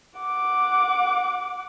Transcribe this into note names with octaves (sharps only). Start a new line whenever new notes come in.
F#5 D6